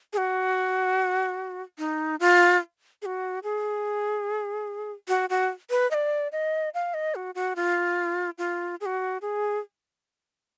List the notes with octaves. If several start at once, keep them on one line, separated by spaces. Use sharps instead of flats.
G#4
F#4
D#4
F4
G#4
F#4
G#4
F#4
F#4
B4
D#5
D5
D#5
F5
D#5
F#4
F#4
F4
F4
G#4
F#4
G#4